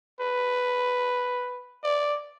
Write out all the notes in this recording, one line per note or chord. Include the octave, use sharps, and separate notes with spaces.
B4
D5